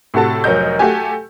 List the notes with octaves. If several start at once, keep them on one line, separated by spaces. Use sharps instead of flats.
A2 C3 F#4 A4 A5
F1 F#3 A#4 D#5 G6
A3 F#4 G4 G#5